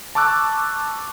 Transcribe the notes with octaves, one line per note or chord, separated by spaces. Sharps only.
A5 C#6 D6 E6 F#6